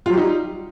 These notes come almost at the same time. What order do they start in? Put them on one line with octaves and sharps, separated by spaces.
F4 F#3 G4 D#4 G3